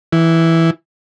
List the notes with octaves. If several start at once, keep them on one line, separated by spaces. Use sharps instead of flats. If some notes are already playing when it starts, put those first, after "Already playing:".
E3